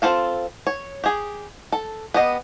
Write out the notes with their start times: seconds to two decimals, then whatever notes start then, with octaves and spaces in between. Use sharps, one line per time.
0.02 C4 F4 A4 F5
0.67 C#5
1.04 G4 G#4
1.72 A4
2.14 B3 G4 D#5